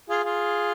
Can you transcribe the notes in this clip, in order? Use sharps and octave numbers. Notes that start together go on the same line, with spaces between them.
F4 G#4
F4 G#4